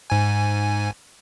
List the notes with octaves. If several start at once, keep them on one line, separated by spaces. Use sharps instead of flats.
G#2 G#5